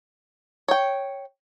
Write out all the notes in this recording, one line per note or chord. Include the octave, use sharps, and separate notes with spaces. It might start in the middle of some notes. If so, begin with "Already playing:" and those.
C#5 G5